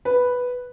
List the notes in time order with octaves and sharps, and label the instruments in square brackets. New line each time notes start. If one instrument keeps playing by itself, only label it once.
[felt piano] B4